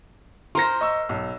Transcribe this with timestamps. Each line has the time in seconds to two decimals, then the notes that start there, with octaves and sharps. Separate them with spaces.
0.55 A#4 C5 C6 A#6
0.81 D#5 C#6 E6
1.09 B1